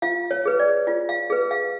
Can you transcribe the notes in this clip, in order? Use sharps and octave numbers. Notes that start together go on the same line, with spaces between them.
F4 F5
C#5
G#4 B4
D5
F4
F5
G#4 B4
F5